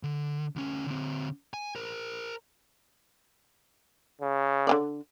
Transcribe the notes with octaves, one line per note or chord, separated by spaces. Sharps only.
D3
D2 C#4
D3 C4
G#5
A#4 C5
C#3
D3 C4 D5